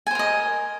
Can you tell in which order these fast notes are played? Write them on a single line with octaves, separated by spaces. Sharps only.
G#5 C5 A#4 D#5